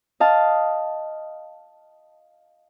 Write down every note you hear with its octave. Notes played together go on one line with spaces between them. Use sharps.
D#5 F5 A5